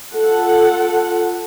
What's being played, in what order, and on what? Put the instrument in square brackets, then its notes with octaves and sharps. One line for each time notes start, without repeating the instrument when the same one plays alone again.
[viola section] F4 A4 F#5